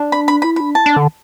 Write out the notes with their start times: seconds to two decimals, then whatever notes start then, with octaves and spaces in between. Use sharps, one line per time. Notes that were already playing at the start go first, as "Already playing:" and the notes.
Already playing: D4
0.12 B5
0.28 B5
0.42 E4 B5
0.56 D4 B5
0.75 E4 A5
0.86 D4
0.97 D3